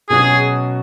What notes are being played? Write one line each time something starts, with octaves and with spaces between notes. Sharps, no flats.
B2 F#3 C#4 F#4 G#4